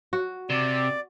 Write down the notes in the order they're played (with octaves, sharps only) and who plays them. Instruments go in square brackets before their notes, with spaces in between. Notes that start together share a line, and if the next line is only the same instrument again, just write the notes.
[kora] F#4
[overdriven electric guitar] C3 [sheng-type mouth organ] D5